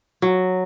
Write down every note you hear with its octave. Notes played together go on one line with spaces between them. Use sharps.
F#3